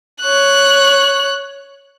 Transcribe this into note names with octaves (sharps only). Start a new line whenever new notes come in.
C#5 F#6